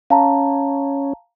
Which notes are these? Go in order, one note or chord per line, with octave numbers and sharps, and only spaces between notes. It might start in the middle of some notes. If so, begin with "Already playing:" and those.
C#4 F5 A5 A#5